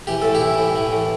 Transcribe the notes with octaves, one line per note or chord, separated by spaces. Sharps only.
E3 G4
A2 A4
E4 G4
E3
A2
E3
A2